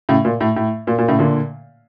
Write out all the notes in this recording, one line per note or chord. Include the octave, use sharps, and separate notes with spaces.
A2 C#3
A#2
A2
A2
A#2
A#2
A2 C#3
A#2 D3